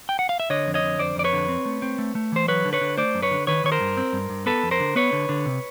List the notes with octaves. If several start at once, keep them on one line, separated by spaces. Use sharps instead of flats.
G5
F#5
F5
E5
D3 C#5 D#5
F2
C#5 D#5
D3
F2 C5 D5
F2 D5
B4 C#5
D3
C4
A3
C4
A3
A3
E3 C5
F#3 B4 C#5
D3
B4 C#5
D3
A3 C5 D5
F#2
B4 C#5
D3
D#3 B4 C#5
D#3 C#5
A#4 C5
G2
C4
G2
G2
B3 A4 B4
F2
A#4 C5
D3
B3 B4 C#5
D3
D3
C3